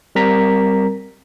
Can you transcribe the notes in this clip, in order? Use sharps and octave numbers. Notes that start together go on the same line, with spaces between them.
G3 C4 A#4 A#5 B6